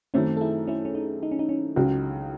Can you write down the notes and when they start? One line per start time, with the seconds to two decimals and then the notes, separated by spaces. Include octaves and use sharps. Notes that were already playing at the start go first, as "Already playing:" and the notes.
0.14 F#2 D#3 A3 C4 C#4 E4
0.37 A4
0.41 E4 G#4
0.67 C#4 E4
0.85 C#4
0.95 D#4
1.23 D#4
1.31 C#4
1.39 D#4
1.49 C#4
1.76 C#2 C#3 F#3